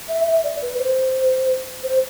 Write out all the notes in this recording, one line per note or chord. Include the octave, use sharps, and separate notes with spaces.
E5
E5
D5
B4
C5
C5